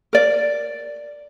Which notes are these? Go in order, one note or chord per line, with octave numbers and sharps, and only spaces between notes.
A#4 D5